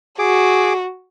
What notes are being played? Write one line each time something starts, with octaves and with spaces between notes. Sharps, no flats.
F#4 G#4 D6